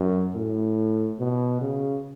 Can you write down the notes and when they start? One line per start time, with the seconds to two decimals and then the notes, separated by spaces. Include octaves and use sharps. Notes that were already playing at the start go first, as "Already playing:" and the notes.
Already playing: F#2
0.34 A2
1.19 B2
1.61 C#3